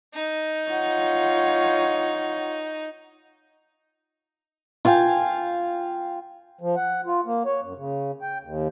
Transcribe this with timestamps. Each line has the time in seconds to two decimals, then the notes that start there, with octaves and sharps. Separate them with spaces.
0.14 D#4
0.70 F4 C#5 F#5
4.85 F4 F5 G5 G#5
6.61 F3
6.76 F#5
7.06 F4
7.26 A#3
7.45 C#5
7.62 F#2
7.76 C#3
8.22 G5
8.43 D#2